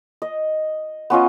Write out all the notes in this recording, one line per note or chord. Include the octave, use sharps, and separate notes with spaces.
D#5
B3 C#4 F4 D#5